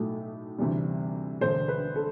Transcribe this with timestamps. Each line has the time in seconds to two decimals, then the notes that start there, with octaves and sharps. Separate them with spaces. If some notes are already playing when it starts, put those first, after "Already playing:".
Already playing: B1 A2 F#3 A3
0.58 D2 C3 E3 G3
1.41 E1 D2 D3 C5
1.68 B4
1.96 A4